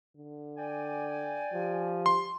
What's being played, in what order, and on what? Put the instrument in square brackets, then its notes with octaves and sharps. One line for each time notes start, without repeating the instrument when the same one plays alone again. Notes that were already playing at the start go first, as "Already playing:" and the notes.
[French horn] D3
[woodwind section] D5 G5 G#5
[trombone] F3 [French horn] G4
[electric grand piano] C6